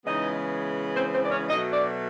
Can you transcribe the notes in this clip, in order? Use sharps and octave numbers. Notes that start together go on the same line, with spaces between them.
C#3 E3 G#3 B3 D#4 D#5
C4 C5
C4 C5
D5
C#4 C#5
B2 F#3 A3 D#4 D#5
D4 D5